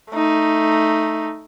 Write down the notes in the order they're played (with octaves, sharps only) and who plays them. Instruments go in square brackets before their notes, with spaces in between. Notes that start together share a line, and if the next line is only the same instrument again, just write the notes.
[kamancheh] A3 D#4